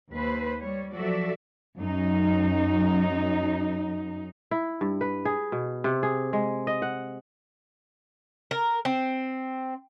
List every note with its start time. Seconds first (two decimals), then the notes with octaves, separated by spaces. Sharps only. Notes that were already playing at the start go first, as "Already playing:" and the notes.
0.12 D#2 B4 C5
0.60 G3 C#5
0.93 F3 F#3 F#4 A4 D5 E5
1.77 F#2 D#4
4.51 E4
4.81 G2
5.01 B4
5.25 G#4
5.52 B2
5.84 C3
6.03 G#4
6.33 G#3
6.67 D#5
6.82 F#5
8.51 A#4
8.85 C4